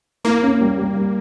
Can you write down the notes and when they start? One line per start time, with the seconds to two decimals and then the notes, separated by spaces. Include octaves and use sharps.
0.24 A#3 E4
0.42 C#4
0.61 G3
0.78 G3
0.96 G3